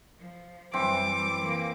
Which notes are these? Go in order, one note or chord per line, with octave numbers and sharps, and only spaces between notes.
F3
F#2 E3 G3 C4 D6
E3 A#3